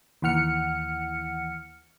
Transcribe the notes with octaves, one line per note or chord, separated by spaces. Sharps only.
D#2 E3 F#5 F6 C#7